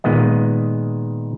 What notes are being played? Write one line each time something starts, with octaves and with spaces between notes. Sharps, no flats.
A#2 D#3 G#3 B3 D#5